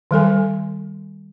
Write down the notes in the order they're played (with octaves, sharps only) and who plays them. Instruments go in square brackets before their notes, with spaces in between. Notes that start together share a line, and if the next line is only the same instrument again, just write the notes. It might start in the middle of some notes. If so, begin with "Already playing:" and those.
[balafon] D#3 G3 A4 G#5